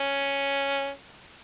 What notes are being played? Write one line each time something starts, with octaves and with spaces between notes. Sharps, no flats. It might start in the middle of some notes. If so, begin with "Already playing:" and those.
Already playing: C#4